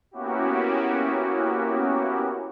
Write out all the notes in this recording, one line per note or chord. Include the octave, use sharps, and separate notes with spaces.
A#3 B3 C#4 E4 F#4 G4